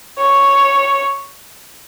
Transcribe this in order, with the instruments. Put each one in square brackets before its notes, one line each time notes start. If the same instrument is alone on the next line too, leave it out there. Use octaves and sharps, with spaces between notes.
[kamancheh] C#5